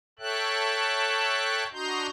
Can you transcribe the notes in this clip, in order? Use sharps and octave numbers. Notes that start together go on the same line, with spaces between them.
A4 C#5 E5 G5 A5 F#6
D4 F#4 D#5 A#5 C6 G6